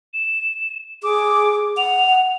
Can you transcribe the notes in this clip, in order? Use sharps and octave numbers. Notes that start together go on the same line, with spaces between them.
E7
G#4 D6
F#5 F7